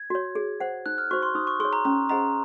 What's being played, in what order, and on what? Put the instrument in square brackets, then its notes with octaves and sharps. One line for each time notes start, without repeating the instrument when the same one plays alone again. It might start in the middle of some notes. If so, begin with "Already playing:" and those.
Already playing: [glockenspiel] G#6
[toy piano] F#4 C#5
G#4
C5 F#5
[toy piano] D#4 [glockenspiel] F#6
[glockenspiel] F6
[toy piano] F#4 C5 [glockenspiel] C#6
[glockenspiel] C6
[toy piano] D#4 [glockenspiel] D#6
[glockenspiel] C#6
[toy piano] G#4 [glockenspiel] C6
[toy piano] C#5
[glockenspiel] A#5
[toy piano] C#4 [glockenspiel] A#5
[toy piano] G#4 C5 D#5 F#5 [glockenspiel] A#5